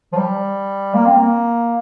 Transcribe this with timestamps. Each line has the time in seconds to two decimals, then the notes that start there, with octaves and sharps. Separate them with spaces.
0.12 F3
0.17 G3
0.94 A#3
1.06 C4
1.17 A#3